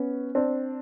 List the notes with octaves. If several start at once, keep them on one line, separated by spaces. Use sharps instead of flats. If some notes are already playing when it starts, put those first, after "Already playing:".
Already playing: B3 C#4
C4 D4